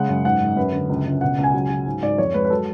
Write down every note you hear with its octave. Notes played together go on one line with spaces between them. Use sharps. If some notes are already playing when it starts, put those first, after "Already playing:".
Already playing: C#3 G#3 F#5
F#2
G#2 F#5
G#2
F#2 B4
D3
C#2
C#2
B2 F#5
C#2
G#5
F#3
F#3
G#2
G#2 D5
F2 C#5
G#3 B4
B4
F#3 A4